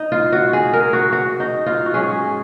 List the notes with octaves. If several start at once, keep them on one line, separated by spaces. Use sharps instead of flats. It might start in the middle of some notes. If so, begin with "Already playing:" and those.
Already playing: D#4
F4
F#4
G#4
A#4
F#4
F#4
D#4
F4
F#4
G#2 F#3 C#4 G#4